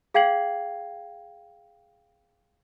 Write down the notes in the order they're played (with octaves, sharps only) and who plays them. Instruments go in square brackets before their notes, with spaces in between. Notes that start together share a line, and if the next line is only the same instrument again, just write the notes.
[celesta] G#4 F5 G5 G#6 C7 F#7